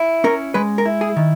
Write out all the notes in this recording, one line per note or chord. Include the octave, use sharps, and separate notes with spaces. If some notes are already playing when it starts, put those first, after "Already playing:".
Already playing: E4
C#4 A#4
G#3 B4
A#4
E4
G#4
D#3